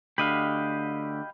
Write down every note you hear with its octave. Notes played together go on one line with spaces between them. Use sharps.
D2 D3 G4 D#5 F5 B5